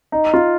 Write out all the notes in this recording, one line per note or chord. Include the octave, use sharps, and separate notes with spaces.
D#4
F4